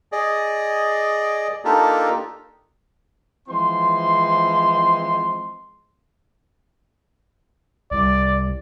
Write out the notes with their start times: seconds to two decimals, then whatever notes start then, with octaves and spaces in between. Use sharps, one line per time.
0.12 G#4 D5 D#5
1.65 A#3 D4 D#4 F4 G4 A4
3.48 E3 F3 G#3 C4 C6
7.91 C2 D5